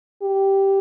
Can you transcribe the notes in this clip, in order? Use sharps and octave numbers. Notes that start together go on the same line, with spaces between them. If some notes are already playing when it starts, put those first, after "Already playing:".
G4